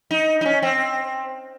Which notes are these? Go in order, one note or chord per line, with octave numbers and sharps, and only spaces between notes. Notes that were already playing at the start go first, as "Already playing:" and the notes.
D#4
D#4
C#4
C4